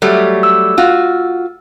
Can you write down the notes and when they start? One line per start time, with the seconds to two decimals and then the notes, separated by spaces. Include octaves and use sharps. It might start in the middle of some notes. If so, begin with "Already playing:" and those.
0.02 F#3 G3 A3
0.43 E6
0.78 F4 F#4